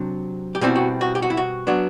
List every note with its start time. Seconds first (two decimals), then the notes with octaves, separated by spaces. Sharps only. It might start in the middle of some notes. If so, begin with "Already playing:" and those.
Already playing: C3 F#3 D4
0.55 G4
0.61 B2 G3 C4 E4 F#4
0.76 F#4
1.01 F#4
1.15 G4
1.22 F#4
1.30 E4
1.37 F#4
1.67 F#3 B3 D4